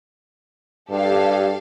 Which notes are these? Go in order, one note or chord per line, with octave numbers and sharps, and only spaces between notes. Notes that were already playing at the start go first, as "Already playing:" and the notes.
G2 G4 A4 F5